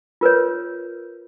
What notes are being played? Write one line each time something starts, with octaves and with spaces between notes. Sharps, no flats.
F4 A#4 B4 C#5